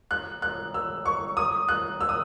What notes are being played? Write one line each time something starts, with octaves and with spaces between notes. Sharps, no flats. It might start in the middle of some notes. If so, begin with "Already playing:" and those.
F#6
F#6
E6
C#6
D#6
F#6
E6
D#6